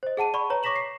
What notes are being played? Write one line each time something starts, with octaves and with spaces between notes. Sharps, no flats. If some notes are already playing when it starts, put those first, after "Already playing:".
C5 D#5
G#4 F#5 A5 D#7
D5 B5 C#6
B4 C#5 A#5
C#6 D6 A#6 B6 E7 F#7
C7